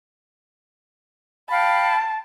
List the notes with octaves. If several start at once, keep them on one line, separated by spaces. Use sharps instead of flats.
F5 G5 A5 B5